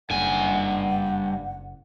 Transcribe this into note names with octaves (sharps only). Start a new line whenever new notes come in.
F#1 G2 F#5 G#5